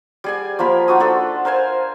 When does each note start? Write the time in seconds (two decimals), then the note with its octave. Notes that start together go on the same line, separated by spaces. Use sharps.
0.24 G3 G#4 G#5
0.59 F3 A#3 A#4 B5
0.88 D#4 F4 F#4 D#6
1.00 D4 F4 A4 F#5
1.45 A#4 C5 F5 G#5